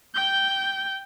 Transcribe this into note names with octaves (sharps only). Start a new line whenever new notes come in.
G5 G6